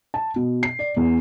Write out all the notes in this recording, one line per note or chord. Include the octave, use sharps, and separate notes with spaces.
A5
B2
C7
D5
E2